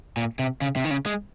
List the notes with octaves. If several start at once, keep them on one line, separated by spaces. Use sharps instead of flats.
A#2
C3
C#3
C3
D#3
C#3
G#3